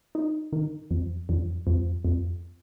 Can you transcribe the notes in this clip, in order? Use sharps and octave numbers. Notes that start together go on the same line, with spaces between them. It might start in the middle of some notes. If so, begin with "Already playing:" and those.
D#4
D#3
F2
F2
F2
F2